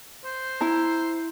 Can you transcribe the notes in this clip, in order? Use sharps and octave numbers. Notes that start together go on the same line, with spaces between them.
C5
E4 A#5